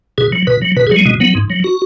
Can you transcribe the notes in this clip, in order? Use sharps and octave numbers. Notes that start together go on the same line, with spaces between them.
B2 G#4
F#3
B2 B4
F#3
B2 B4
G#4
F#3 G#3
B2 G#3
F#3 B3
G#2
F#3
F#4